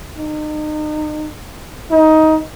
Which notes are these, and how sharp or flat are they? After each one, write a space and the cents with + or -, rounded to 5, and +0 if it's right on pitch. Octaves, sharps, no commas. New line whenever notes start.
D#4 -35
D#4 +15